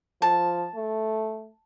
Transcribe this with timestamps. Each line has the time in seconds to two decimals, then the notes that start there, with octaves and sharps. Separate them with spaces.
0.22 F3 A5
0.75 A3